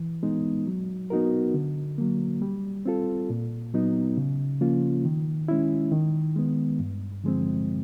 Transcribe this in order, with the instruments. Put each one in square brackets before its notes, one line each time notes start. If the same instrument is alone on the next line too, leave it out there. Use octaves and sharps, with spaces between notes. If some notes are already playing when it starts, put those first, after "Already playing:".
Already playing: [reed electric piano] E3
G#3 B3 D#4
F#3
B3 D#4 F#4 A#4
D3
F#3 A#3
G3
C4 F4 A4
A#2
F#3 B3 D#4
C#3
F3 A#3 C#4 F4
D#3
G#3 C#4 E4
D#3
G#3 B3
G2
D3 F3 G#3 C4